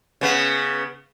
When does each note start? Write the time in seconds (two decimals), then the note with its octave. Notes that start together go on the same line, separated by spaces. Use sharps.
0.21 C#3 B3